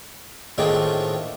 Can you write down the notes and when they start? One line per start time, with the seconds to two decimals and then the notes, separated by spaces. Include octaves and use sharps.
0.58 A2 D#3 C4 D4 F4 G#4